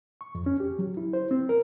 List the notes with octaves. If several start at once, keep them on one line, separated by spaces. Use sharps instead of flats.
C#6
F2
C#4
G4
F#3
E4
C5
C4
A#4